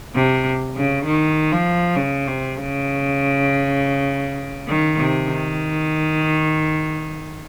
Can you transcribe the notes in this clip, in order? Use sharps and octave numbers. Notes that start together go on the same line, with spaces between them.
C3
C#3
D#3
F3
C#3
C3
C#3
D#3
C3
D#3